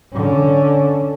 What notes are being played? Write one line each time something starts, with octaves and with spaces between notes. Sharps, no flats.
D3 C#4